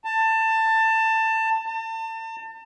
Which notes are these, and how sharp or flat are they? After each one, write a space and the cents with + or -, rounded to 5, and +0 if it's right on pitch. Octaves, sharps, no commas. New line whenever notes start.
A5 +20
A5 +35